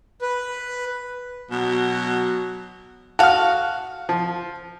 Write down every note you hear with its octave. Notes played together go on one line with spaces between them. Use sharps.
B4
B2 F#3
F#4 A4 F5 F6
F3